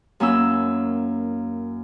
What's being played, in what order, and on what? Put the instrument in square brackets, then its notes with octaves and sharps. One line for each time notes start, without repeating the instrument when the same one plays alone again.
[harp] F#2 A#3 C#4 E4 E6